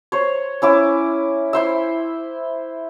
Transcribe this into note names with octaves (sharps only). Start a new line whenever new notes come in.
C5 C#5
C#4 E4 D6
E4 C5 E5